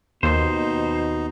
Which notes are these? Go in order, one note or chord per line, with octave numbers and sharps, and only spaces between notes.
D#2 B2 D#4 C5